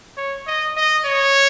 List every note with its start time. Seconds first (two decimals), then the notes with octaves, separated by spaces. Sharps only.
0.17 C#5
0.47 D#5
0.77 D#5
1.06 C#5